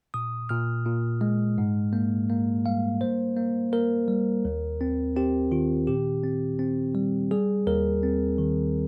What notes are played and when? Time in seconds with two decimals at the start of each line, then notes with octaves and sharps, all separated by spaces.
0.14 A#2 D#6
0.49 A#2 F6
0.86 A#2
1.21 G#3
1.58 G#2
1.93 A#3
2.30 A#3
2.66 G3 F5
3.01 A#3 C5
3.36 A#3
3.73 A#3 A#4
4.08 G3
4.45 D#2
4.81 C4
5.16 C4 G4
5.51 D#3 F4
5.87 A#2 G4
6.23 C4
6.59 C4
6.95 G3
7.31 G3 G#4
7.67 D#2 A#4
8.03 C4
8.38 D#3